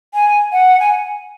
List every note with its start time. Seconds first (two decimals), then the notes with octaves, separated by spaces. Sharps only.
0.14 G#5
0.52 F#5
0.80 G#5